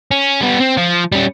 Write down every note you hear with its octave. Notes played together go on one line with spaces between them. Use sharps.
C#4
G3 B3
C4
F3
G3 C#4